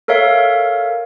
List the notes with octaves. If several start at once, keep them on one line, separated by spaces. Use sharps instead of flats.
A4 A#4 C#5 E5 F5